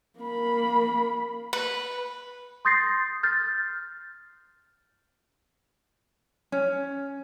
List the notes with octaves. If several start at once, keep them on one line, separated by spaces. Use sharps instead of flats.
A#3 B5
B4
C6 D#6 G6 A6 A#6 C7
F6 G6 A6
C#4